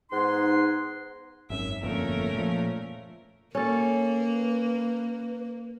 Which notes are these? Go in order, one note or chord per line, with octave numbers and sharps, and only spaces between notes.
G#2 B3 D#4 G#4 F#5 C6
G#1 F#2 E5
G1 F2 A#2 A3 C#4 A#4
A#2 F3
A#3 C#4 A4
B4